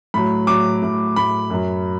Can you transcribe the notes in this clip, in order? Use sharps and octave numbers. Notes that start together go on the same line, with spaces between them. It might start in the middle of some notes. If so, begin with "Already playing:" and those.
A2 F#3 B5
A2 F#3 D6
A2 F#3
A2 F#3 B5
F#2 F#3